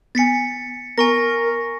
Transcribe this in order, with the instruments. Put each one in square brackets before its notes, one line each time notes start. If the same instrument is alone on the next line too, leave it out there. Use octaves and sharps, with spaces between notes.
[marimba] B3 G#5 [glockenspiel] A6 B6 C#7
[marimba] B3 [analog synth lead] A#4 [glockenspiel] G#5 C#6 A#6